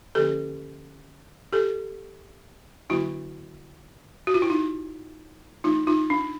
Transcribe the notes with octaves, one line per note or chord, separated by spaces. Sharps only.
D3 F3 A#3 C#4 G4 A4
G4 A4
D3 F#3 A#3 D4 E4 F#4
F#4
F4
E4
D#4 F4
E3 A3 D4 D#4 F4
D#4 F4
D4